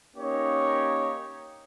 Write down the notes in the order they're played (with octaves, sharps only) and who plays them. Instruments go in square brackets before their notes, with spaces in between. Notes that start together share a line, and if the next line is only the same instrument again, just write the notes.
[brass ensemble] A#3 C#4 D#4 G4 C#5